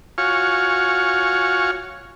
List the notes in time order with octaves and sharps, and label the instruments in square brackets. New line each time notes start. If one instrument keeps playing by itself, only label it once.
[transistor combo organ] F4 F#4 C#5 F5 G#5 C#6